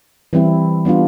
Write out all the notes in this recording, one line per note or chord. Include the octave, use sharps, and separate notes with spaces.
E3 G3 C4 E4
G3 B3 D4 F4